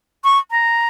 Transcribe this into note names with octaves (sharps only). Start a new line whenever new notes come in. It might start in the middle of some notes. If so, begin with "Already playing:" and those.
C#6
A#5